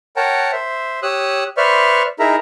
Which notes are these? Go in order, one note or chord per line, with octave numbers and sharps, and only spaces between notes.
A#4 C#5 F#5 G5 A5 A#5
C5 E5
G4 C#5 D#6 E6 F#6
B4 C5 D5 E5 C#6 F6
D#4 E4 G#4 A#4 E5 A#5